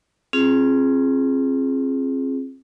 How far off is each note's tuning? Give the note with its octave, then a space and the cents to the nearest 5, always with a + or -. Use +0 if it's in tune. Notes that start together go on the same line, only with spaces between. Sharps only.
C4 +35 F4 -20 G#4 +10